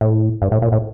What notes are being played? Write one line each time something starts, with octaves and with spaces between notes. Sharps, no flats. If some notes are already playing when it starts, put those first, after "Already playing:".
A2
G2
A2
A#2
A2